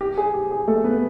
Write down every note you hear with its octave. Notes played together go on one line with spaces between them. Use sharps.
G4
G#4
G4
G#4
A3 A4
B3 B4